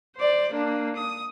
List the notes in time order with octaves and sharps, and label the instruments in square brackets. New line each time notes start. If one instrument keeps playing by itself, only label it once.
[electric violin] C5 D5
A#3 D4
D#6